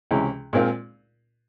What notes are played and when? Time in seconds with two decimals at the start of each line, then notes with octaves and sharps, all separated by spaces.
0.11 C#2 C3 E3 G#3 C#4
0.53 A#2 G#3 C4 F4 A#4